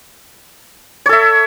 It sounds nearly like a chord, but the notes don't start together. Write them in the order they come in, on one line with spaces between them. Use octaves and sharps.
C#5 A4 E5